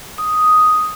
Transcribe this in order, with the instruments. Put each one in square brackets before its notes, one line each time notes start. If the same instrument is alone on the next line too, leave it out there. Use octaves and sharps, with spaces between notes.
[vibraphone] D#6